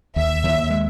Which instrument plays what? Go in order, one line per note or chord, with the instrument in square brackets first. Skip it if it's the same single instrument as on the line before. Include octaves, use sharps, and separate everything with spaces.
[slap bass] D#2 [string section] E5
[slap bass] D#2
G#3